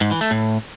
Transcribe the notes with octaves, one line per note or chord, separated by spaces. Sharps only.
G#2
E3
A3
A2